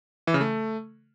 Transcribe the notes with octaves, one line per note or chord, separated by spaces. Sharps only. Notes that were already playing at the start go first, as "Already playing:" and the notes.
E3
C#3
A3